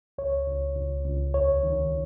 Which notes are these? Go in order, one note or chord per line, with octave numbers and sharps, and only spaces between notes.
C#2 C#5
C#2
C#2
C#2
D#2 C#5
D#3